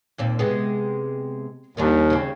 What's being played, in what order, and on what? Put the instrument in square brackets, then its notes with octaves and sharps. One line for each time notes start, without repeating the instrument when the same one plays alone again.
[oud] D#2 A#2 C4
C3 G#3 B3
[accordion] D#2 [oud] D#3 G3 D4
[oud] C#3 C4